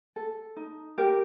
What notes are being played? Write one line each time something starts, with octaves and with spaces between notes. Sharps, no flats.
A4
D#4
G4 A#4